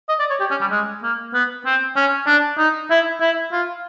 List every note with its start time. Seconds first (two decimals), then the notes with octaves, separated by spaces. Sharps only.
0.09 D#5
0.20 D5
0.30 C#5
0.40 G4
0.51 C#4
0.61 G3
0.71 G#3
1.03 A#3
1.34 B3
1.66 C4
1.96 C#4
2.27 D4
2.58 D#4
2.90 E4
3.21 E4
3.52 F4